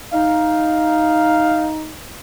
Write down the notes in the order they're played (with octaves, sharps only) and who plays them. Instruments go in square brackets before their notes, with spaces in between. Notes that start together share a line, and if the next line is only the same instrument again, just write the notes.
[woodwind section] D#4 [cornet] F5